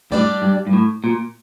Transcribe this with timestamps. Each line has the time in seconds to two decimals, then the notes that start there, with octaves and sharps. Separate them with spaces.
0.11 A2 G3 D4 G4 D5
0.42 G2
0.67 G2
0.73 A2
1.04 A#2